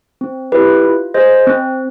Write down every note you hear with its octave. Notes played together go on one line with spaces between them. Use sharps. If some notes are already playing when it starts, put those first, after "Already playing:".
C4
E4 G4 B4
F4
G#4 C5 D#5
C4